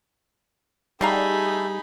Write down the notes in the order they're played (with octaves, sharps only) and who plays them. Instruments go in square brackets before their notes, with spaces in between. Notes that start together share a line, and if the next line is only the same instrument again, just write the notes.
[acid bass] G3 [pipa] A3 F5 A#5 [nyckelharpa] D#4 [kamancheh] G#4 B5